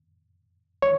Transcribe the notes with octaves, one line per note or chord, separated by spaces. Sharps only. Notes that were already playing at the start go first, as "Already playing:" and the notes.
C#5